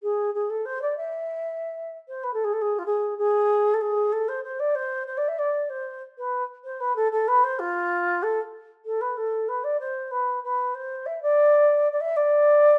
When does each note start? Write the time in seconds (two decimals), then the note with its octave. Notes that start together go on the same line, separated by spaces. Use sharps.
0.03 G#4
0.34 G#4
0.50 A4
0.65 C5
0.82 D5
0.97 E5
2.08 C5
2.24 B4
2.34 A4
2.44 G#4
2.53 A4
2.61 G#4
2.79 F4
2.86 G#4
3.18 G#4
3.74 A4
3.81 G#4
4.12 A4
4.29 C5
4.44 C5
4.60 D5
4.75 C5
5.07 C5
5.17 D5
5.28 E5
5.39 D5
5.70 C5
6.18 B4
6.64 C5
6.80 B4
6.96 A4
7.12 A4
7.28 B4
7.44 C5
7.59 F4
8.23 A4
8.85 A4
9.01 B4
9.17 A4
9.49 B4
9.64 D5
9.80 C5
10.11 B4
10.44 B4
10.75 C5
11.06 E5
11.22 D5
11.92 D5
12.01 E5
12.16 D5